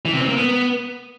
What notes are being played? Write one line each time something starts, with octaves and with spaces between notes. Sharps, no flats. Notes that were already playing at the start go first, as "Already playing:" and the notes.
E3
C3
C4
A#3
B3